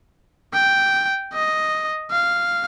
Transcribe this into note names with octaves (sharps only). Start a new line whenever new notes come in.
G5
D#5
F5